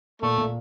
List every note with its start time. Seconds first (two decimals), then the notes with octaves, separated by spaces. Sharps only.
0.22 A#2 A3
0.38 A#2